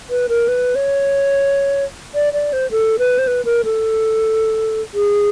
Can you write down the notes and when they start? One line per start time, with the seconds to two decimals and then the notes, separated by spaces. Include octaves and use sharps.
0.10 B4
0.29 A#4
0.48 B4
0.75 C#5
2.15 D5
2.33 D5
2.53 C5
2.71 A4
2.99 B4
3.19 C5
3.27 B4
3.45 A#4
3.65 A4
4.94 G#4